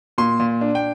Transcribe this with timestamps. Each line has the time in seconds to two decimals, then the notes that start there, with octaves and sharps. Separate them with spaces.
0.18 A#2 C6
0.40 A#2
0.61 D4
0.75 G5